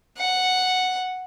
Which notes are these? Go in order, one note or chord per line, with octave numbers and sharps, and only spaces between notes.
F#5